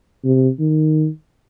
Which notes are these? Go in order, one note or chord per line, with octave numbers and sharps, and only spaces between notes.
C3
D#3